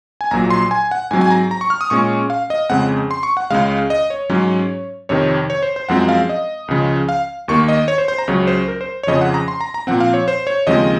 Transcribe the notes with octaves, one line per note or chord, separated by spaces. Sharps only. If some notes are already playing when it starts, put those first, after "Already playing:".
G#5
A#1 A#2 F#3 A#5
C6
G#5
F#5
G#2 F#3 C4 G#5
G#5
A#5
A#5
C#6
F6
D#6
A#2 G#3 C#4 C#6
F5
D#5
F2 C#3 G#3 C4 F#5
C6
C#6
F#5
C#2 C#3 G#3 F5
D#5
C#5
G#2 F#3 C#4
F2 C3 D#3 C#5
C#5
C5
C5
F#2 F3 G#3 C4 F#5
F5
D#5
C#2 C#3 F3
F5
D#2 D#3 A#3 C#6
D#5
C#5
C5
C5
A#5
C#2 C#3 F#3 C#5
C5
A#4
C5
C#5
F2 C#3 F3 D#5
F#5
A#5
C6
A#5
A#5
A#2 F3 C4 F#5
F5
C#5
C5
C#5
D#2 C#3 F3 G#3 C4 D#5